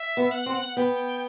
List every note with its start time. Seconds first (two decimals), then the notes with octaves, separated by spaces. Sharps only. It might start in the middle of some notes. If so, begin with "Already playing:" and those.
Already playing: E5
0.17 B3
0.31 F#5
0.46 C4
0.76 B3 G5